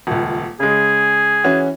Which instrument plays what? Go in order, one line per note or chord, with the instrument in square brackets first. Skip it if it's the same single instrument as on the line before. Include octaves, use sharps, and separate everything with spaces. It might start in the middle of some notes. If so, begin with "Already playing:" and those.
[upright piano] D#1 C#2
[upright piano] C#3 G#3 [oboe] G#4
[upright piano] E3 C#4 F#4